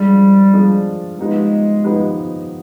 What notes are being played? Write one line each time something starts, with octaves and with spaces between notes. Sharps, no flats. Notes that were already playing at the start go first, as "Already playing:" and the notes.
Already playing: F3 G3 G#3 D4
F3 G#3 D4
F3 G#3 B3 D#4 G4 B4
F3 B3 D#4 G4 B4